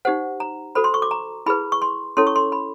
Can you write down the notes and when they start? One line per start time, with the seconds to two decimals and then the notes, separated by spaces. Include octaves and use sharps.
0.05 D#4 G4 C5 F#5
0.40 A#5
0.75 F#4 A4 C5 B5
0.84 C6
0.94 C#6
1.02 D6
1.11 A#5
1.46 E4 G#4 B4 B5
1.72 C#6
1.82 C6
2.17 C#4 E4 A4 C#5 C6
2.27 C#6
2.36 C6
2.52 B5